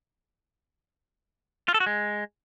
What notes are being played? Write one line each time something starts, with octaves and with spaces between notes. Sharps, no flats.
F4
A4
F#4
G#3